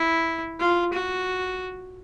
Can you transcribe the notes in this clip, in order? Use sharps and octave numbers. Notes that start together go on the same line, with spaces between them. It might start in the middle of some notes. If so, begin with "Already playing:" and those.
Already playing: E4
F4
F#4